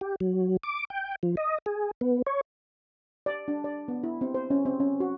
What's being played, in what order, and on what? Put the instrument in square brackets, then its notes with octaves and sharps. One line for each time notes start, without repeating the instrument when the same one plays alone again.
[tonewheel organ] G4
F#3
D6
G5
F3
D#5
G#4
B3
C#5
[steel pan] D5
D4
D5
B3
E4
C4
C5
C#4
C4
C#4
F#4